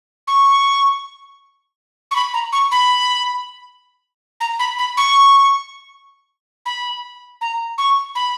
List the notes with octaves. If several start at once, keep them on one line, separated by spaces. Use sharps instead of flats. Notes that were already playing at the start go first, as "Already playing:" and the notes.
C#6
C#6
B5
A#5
C#6
B5
A#5
B5
B5
C#6
B5
A#5
C#6
B5